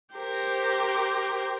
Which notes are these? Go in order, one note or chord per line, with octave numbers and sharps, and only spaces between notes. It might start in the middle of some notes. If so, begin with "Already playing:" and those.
G4 A#4 C5